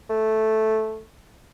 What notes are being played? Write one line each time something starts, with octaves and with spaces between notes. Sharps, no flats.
A3